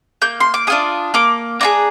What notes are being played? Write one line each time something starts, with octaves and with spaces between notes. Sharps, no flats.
A#3 G6
C6
D6
D4 F4 G#4 D#6
A#3 D6
D4 F4 G#4 A#5